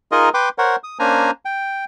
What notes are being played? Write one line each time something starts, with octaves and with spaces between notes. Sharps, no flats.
D#4 F4 G#4 A#4 D#5
B4 G5 C6 D6
A#4 C5 C#5 F#5
D#6
A#3 C#4 D4 C5 G#5 A#5
G5